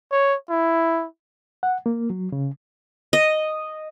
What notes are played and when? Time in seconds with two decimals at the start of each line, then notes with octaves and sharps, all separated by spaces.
0.12 C#5
0.50 E4
1.63 F#5
1.86 A#3
2.10 F#3
2.32 C#3
3.13 D#5